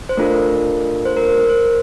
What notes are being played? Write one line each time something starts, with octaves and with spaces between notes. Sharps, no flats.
C5
A3 D4 F4 A4 A#4
C5
A#4
C5
A#4
C5